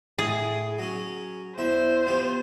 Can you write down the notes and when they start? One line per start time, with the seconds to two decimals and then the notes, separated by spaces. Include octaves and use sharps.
0.19 A2 G#4
0.79 F#3 C#4
1.58 E2 C5 E5
2.06 F3 B3 G4